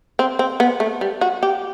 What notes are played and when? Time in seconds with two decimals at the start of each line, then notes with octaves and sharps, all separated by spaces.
0.19 C4
0.39 C4
0.60 B3
0.80 A3
1.01 G3
1.21 F#4
1.43 G4